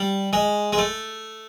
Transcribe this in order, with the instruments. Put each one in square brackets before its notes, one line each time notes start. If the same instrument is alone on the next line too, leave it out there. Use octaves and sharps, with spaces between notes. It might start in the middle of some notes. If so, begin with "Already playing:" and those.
Already playing: [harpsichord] G3
G#3
G#3
A3